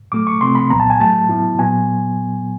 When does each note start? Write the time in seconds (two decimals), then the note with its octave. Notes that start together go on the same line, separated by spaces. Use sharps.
0.12 A2 F#3 A3 D6
0.27 C#6
0.41 C3 F3 A3 C4 C6
0.55 B5
0.70 C2 A#2 F#3 B3 A#5
0.80 A5
0.90 G#5
1.00 A2 F#3 A3 A5
1.29 A2 F#3 B3 E4
1.59 A#2 F#3 B3 G#5